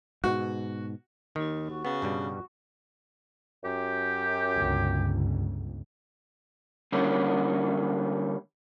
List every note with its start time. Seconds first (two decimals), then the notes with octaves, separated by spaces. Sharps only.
0.24 G#2 B2 F#4
1.36 D#2 D#3
1.69 F#4
1.85 C#3 B3
2.02 G2 B2 G3
3.64 F#2 G4
4.56 G1 C#2
6.92 D3 G3 A#3 C#4